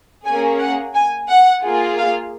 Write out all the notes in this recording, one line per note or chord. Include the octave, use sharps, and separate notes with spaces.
A#3 C#4 G#4 G#5
F#5
G#5
F#5
A#3 F4 G#4
F5